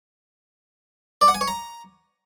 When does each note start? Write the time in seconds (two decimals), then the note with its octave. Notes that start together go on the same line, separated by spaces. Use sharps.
1.21 D5
1.28 F#5
1.35 G#5
1.41 C#5
1.48 A#5